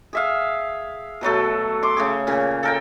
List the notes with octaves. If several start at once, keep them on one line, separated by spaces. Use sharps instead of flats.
G#4 E5 F5
B2 F#3 A3 A4
C6 D6
C#3 A3 G#4
A#2 C#3
A4 A#4 G5